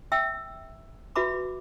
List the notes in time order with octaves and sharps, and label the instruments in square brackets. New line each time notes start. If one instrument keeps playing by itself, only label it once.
[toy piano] E5 G5 E6
F#4 B4 E5 B5 D6